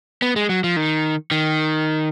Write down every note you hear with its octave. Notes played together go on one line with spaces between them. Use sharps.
B3
G#3
F#3
F3
D#3
D#3